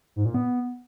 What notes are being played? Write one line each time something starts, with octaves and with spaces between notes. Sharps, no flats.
G#2
A#2
B3